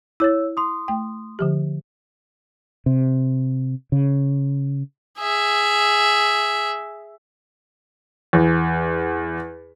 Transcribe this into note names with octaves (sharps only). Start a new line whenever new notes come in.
E4 C#5 E6 A6
C6 D#6
A3 G5
D3 F3 G4
C3
C#3
G#4 E5
E2